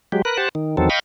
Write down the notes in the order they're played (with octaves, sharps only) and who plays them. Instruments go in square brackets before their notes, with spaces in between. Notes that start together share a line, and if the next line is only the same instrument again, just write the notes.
[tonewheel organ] F#3 G#3 G4
A#4 B4 F#6
G4 C5 F#5 A5
D#3
E2 D#3 F#3 C4 A4
D#5 F5 G5 B5 C#6